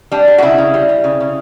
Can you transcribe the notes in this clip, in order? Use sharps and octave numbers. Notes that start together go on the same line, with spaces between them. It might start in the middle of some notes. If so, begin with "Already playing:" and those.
G3 D4
G3
F#4
C#3 E4
C#3
G3
G3
C#3
C#3